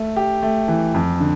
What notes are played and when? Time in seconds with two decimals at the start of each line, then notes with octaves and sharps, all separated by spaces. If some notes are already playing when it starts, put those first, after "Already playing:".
Already playing: A3
0.16 G4
0.43 A3
0.68 E3
0.94 F2
1.20 D3